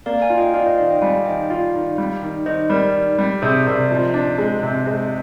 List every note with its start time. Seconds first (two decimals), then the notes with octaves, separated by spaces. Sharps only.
0.06 A#3 D5 F5
0.22 F5 G#5
0.30 F4
0.38 D#5 G5
0.54 F4 D5 F5
0.66 C5 D#5
0.78 D#3 D5 F5
0.90 D#5 G5
1.02 G3 F5 G#5
1.26 D#3 D#5 G5
1.50 F4 D5 F5
1.75 D#3
1.98 G3
2.22 D#3
2.46 D#3 C5 D#5
2.70 G3 A#4 D5
2.94 D#3
3.19 G3
3.42 C3 G#4 C5
3.66 C3 A#4 D5
3.90 F3 C5 D#5
4.14 D4
4.38 G#3
4.63 C3
4.86 G#3 C5 D#5